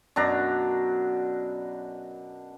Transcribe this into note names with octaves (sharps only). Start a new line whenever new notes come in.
F#2 B2 D4 A#5